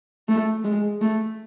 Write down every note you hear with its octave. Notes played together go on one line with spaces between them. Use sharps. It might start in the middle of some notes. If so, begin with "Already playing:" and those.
A3
G#3
A3